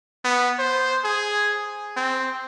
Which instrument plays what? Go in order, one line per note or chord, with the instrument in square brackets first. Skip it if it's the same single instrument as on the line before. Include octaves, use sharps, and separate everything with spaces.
[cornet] B3
C5
G#4
C4